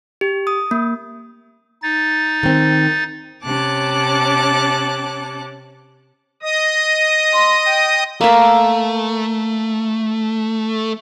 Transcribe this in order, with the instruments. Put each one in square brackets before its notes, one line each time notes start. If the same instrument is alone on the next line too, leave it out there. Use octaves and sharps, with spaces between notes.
[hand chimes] G4
D#6
A#3
[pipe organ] D#4 A6
[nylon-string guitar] D#3 C4
[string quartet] C3 C#4 C#5 A5 D6 F#6
[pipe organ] D#5 D#6
[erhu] C6
G5
[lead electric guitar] A3 [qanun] A#3 E5